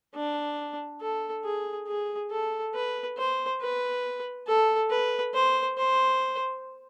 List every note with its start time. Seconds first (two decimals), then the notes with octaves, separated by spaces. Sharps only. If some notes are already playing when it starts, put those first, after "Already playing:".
0.15 D4
1.01 A4
1.44 G#4
1.87 G#4
2.31 A4
2.75 B4
3.18 C5
3.61 B4
4.47 A4
4.90 B4
5.34 C5
5.78 C5